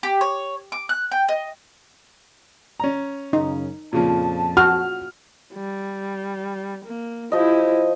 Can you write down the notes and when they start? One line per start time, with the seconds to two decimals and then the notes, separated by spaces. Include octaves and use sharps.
0.03 G4
0.21 C#5
0.72 D6
0.89 F#6
1.12 G5
1.29 D#5
2.80 C#4 A#5
3.33 F#2 C#3 D#4
3.93 F2 A#2 C#3 F3 A5
4.57 F#4 F6
5.53 G3
6.85 A#3
7.32 F3 E4 G4 D#5